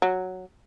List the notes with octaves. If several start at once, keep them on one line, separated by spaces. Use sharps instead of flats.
F#3